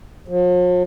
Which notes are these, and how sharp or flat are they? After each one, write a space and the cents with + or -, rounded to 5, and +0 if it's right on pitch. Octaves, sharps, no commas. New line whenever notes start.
F3 +45